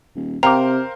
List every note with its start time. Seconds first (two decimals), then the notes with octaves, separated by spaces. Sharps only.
0.15 D#1
0.43 C3 A#4 C5 F5 G5 A#5 D6